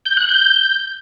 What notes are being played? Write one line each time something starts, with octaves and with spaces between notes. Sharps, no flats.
G6
F#6
G6